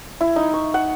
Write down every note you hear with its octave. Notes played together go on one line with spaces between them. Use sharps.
E4
D#4
C#6
F#5